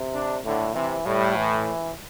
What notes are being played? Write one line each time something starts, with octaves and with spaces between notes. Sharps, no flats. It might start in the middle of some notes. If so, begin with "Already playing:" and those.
Already playing: C3
D4
A2 D3
C3 E3
A2 G3
E3